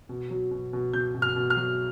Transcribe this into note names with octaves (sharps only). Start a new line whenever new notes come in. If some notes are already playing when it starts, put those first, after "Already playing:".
B2
F#3
B2
B2
B2 G6
B2
F6
B2
F6
F#3